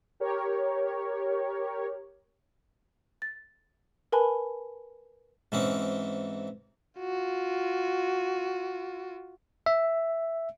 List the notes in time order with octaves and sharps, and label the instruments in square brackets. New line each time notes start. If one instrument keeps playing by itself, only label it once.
[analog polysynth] G4 A#4 C#5
[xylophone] A6
A#4 B4 G#5 A5 B5
[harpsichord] G#2 E3 C4 C#4
[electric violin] F4 F#4
[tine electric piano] E5